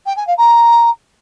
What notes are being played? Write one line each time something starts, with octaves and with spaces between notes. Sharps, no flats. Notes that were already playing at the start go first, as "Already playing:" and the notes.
G5
G#5
F5
A#5